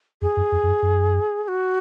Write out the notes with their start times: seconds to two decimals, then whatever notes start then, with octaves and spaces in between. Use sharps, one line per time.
0.22 F2 G#4
0.37 F#2
0.52 F2
0.63 F2
0.67 F#2
0.82 F#2
1.44 G#4
1.48 F#4